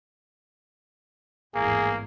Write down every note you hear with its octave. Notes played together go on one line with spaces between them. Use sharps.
A1 E2 G#2 A#3 G#4